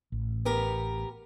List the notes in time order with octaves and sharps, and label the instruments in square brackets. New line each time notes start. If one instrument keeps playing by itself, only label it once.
[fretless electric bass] A1
[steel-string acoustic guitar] B3 G4 A#4